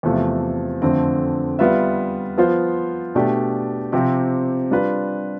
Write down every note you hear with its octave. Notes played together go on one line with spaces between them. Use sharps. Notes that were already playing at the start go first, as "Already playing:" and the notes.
E2 C3 F3 A3
F2 D3 A3 C4
G3 B3 F4 B4 E5
F3 B3 F4 C5
B2 A3 D4 G4 D5
C3 F3 C4 G4 C5
G3 D4 F4 B4